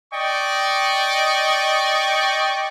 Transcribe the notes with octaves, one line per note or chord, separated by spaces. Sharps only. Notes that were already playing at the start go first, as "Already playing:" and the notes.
D5 D#5 G5 C#6